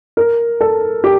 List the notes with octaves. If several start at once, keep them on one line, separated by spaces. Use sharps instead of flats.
A#4
A4
G4